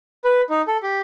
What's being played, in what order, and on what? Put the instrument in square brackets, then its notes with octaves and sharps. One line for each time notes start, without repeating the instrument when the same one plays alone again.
[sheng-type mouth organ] B4
D#4
A4
G4